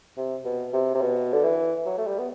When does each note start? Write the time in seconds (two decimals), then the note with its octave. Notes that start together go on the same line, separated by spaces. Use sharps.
0.17 C3
0.45 B2
0.73 C3
0.95 C3
1.01 B2
1.33 D3
1.44 E3
1.86 F#3
1.98 A3
2.07 G3
2.19 B3